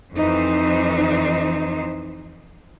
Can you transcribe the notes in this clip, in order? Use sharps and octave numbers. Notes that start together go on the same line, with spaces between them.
F2 E3 D#4 C5